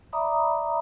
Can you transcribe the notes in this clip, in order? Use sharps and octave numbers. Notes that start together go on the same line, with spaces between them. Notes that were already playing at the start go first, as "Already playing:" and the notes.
D5 E5 A#5 B5 D6 D#6